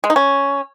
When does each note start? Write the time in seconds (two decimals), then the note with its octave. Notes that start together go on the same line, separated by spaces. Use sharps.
0.04 G#3
0.10 D#4
0.16 C#4